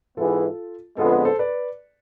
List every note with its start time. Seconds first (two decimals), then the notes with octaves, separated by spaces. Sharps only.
0.17 G#2 E3 B3 E4 F4 G#4 A4
0.98 F2 D3 G#3 B3 F4 A4
1.12 G#4 B4
1.25 A4 C5
1.39 B4 D5